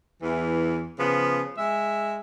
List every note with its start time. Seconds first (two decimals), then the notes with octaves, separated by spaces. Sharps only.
0.22 E2 E3
0.99 C#3 F3 B3
1.58 G#3 E5